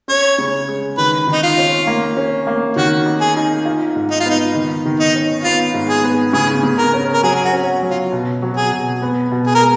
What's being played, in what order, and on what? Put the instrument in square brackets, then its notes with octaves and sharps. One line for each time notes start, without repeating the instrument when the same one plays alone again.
[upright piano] C#4 [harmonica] C#5
[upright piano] C#3
G#3
[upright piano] D#3 [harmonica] B4
[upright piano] D#3 [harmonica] D#4
[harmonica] F4
[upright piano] C#4
A#3
C#4
A#3
[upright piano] D#3 [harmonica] F#4
[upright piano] D#4
[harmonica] G#4
[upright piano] D#4
F4
G#2
[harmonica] D#4
F4
[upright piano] B3 [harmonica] D#4
[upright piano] D#3
D#3
[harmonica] D#4
[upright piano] C#4
[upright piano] B3 [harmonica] F4
[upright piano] G#2
[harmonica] G#4
[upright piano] B3
[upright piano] C#3 [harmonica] G#4
[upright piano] C#3
[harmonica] A#4
[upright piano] C#4
[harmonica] A#4
[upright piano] F#3 [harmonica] G#4
[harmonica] G#4
F#4
[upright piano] C#4
F#3
[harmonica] F4
[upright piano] B2
F#3
[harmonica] G#4
[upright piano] B2
B3
B2
[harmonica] G#4
A#4
[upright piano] G#3